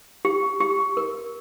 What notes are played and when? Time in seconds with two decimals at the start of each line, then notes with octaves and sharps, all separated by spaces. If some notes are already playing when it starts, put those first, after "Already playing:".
0.25 G4
0.61 G4
0.97 A#4